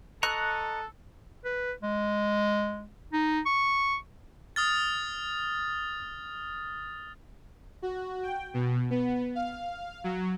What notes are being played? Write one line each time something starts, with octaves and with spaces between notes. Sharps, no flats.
A4 D#5 A#5 C#6 F#6
B4
G#3
D#4
C#6
D#6 F6 A6
F#4
G5
B2
B3
F5
F#3